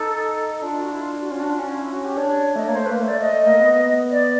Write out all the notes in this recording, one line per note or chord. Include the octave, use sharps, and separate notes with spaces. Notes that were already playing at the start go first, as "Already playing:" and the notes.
Already playing: D#4 A4
D4 F4
F4
F#4
E4
F4
F#4
C#4 F4
D4 F#4
F4
C#4 F#4
F4
E4
F#4
G4
D4 C#5
A3 D#5
A#3 C#5
C5
A3
B4
A#3 C5
A3
D5
D#5
A3
A#3
B3
B3
D5